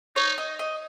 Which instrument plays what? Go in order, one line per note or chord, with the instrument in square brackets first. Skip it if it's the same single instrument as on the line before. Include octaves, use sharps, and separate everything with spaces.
[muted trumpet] D#4 [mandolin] C#5
[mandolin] D#5
D#5